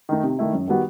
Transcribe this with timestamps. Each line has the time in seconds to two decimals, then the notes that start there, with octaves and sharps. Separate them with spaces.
0.09 D#3 A3 D#4
0.23 C3
0.39 D#3 A3 E4
0.53 F#2
0.67 D#3 G3 B3 F#4